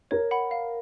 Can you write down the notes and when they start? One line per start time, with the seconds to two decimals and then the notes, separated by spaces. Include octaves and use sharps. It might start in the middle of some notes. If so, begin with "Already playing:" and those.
0.11 A#4 C#5
0.31 F#5 B5
0.51 F5